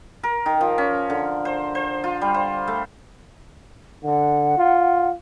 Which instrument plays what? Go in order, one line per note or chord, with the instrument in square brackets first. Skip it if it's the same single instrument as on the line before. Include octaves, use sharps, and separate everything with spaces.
[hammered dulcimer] A#4
D#3
F3
C#4
D3
C5
C5
F4
G3
C5
A3
[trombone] D3 [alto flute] F#5
[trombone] F4